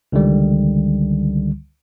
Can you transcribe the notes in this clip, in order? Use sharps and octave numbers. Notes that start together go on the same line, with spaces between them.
C#2 D3 D#3 G3